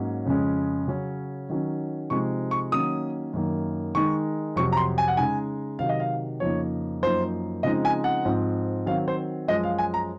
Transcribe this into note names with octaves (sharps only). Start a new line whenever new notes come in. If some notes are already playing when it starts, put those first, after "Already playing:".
Already playing: G#2 F#3 A#3 C#4
F2 C#3 G#3 C#4
C#3 F#3 C#4
D#3 F#3 C#4
C3 F3 G#3 C4 D#4 C#6
C#6
D#3 F#3 A#3 C#4 D#6
F#2 D#3 A#3
D#3 G#3 D#4 C#6
F2 C3 F#3 C#6
A#5
C6
G#5
F#5
C#3 G#3 D#4 G#5
C3 D#3 F#3 F5
D#5
F5
F2 C#3 F3 A#3 D#4 C#5
F#2 F3 A#3 D#4 C5
C#3 F3 G#3 C4 D#4 D#5
G#5
F#5
G#2 F3 C4
D#3 F#3 C4 F5
C5
F#2 F3 G#3 D#5
F5
G#5
A#5